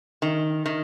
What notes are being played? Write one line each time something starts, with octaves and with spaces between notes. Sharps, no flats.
D#3
D#3